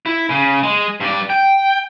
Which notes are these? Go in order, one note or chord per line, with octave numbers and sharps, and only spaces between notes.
E4
C#3
G#3
G2 D5
G5